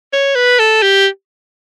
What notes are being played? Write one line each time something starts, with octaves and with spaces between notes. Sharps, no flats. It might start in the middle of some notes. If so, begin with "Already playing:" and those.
C#5
B4
A4
G4